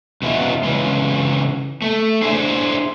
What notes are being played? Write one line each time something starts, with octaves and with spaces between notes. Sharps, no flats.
F#2 B2 E3 F3 E4 F4
C#3 E3 G#3
A3
D4 E4 G#4 C5